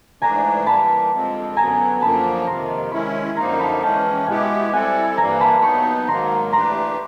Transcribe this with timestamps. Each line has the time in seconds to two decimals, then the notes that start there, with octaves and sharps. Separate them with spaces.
0.22 G#2 E3 A3 D4 G#5 A#5
0.66 E3 G3 A#3 A5 B5
1.11 F2 D3 F3 G#3 C4
1.57 F#2 D3 F#3 B3 G#5 A#5
2.02 F#2 D3 F3 A#3 A5 B5
2.47 F2 C3 D#3 A#5 C6
2.92 D#3 G#3 C#4 E4 B5 C#6
3.37 F#2 D3 F3 A#3 D#4 A#5 C6
3.59 A5 B5
3.82 E3 G#3 C#4 G5 A5
4.27 B2 G#3 B3 E4 G4 F#5 G#5
4.73 G3 C4 E4 A4 F#5 G#5
5.17 G2 E3 G3 A#3 G#5 A#5
5.40 A5 B5
5.62 F#3 B3 D#4 B5 C#6
6.08 G#2 D#3 F#3 A#3 A#5 C6
6.53 E3 A3 D4 G4 B4 A#5 C6